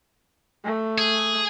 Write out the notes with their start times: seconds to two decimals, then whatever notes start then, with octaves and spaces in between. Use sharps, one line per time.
0.64 A3
0.98 G#4